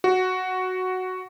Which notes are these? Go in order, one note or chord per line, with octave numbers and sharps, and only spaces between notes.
F#4